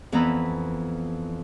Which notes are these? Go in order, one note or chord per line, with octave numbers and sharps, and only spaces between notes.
F2 E3 B3 A#5 B5 E6